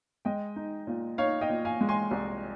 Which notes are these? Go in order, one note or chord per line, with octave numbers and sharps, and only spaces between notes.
G#3 D#5 G5
D#4
A#2
D#4 C#5 F5
D#5 G5
A#2
F5 G#5
G#3
G#5 C6
C2